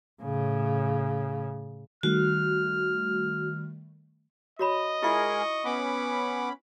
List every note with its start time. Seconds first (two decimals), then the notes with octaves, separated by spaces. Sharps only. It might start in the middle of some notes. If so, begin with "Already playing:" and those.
0.23 A2 C#3
2.03 D#3 G3 A3 F#4 F6
4.59 F#4 C#5 D#5 B5
5.03 G#3 E4 F4 G#4 A#4 E5 C#6
5.65 B3 C#4 F#5 B5 D6